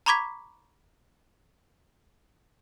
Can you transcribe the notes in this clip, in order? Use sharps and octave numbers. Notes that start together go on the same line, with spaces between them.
A#5 B5 C#6 D6 G#6 B6